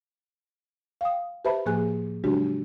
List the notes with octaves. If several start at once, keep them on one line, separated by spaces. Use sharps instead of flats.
F5 G5 D#6
G4 B4 C5 E5 A5 B5
A2 F3 A#3 G#4 G#5 F#6
C#3 F#3 G#3 D4 F#4 G4